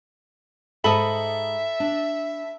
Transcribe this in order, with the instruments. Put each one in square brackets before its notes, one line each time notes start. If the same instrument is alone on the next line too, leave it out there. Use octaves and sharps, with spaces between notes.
[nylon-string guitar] G#2 D#5 [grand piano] A4 B5 F#7 [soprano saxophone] E5
[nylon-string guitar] D4